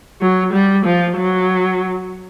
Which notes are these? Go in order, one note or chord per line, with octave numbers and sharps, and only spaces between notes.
F#3
G3
F3
F#3